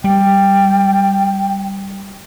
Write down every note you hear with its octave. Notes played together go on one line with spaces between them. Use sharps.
G3 G5